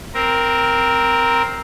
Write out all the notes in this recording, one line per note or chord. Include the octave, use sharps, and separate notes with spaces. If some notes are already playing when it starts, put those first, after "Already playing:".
C4 A#4